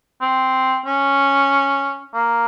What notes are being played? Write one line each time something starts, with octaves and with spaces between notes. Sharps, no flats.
C4
C#4
A#3